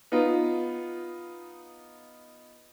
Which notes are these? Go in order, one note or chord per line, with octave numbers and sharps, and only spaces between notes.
B3 D#4 F4